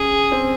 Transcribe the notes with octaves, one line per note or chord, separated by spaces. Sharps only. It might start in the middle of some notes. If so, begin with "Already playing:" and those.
Already playing: C#4 G#4
C4